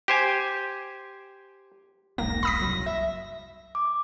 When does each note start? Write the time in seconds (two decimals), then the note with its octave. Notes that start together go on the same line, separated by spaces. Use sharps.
0.08 G4 C5 G#5
2.18 D#1 B1 G#2 A#3 A#6
2.43 B5 D#6 B6
2.61 F#1 C2 F#3
2.86 E5
3.75 D6